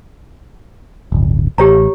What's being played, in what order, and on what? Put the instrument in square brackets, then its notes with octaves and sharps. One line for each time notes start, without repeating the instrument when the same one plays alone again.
[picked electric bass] D1 G1
[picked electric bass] A1 [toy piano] G4 C#5 A#5